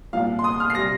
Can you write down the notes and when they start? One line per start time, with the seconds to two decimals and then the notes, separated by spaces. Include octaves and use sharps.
0.13 C2 A#2 F3 F5
0.39 C6
0.44 D#6
0.60 F6
0.70 C7
0.75 C3 G3 A#6